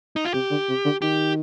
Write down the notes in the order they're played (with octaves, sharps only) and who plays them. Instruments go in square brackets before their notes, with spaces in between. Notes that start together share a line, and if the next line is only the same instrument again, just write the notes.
[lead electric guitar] D#4
F4
[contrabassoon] C3 [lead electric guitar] G4
[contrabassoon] D3
C3
D3
[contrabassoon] D#3 [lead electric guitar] G4